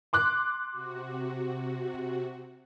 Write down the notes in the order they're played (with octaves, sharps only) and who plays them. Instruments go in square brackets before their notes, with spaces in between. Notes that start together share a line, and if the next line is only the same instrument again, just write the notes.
[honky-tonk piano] C6 D6 F#6
[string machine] C3 F#4